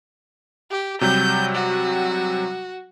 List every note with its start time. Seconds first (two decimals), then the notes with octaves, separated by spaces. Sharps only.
0.71 G4
1.01 C3 F#3 G3 G6
1.55 F#4